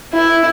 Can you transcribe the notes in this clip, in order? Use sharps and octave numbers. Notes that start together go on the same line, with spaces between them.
E4